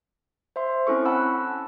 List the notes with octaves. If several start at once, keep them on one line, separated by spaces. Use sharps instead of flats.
C5 E5 C6
C4 C#4 E4 A4 C#6
F#5 G#5 A5 B5 E6 F#6